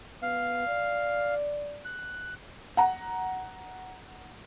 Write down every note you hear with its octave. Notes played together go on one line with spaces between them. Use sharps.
B3 F5
D5
F#6
F#5 A#5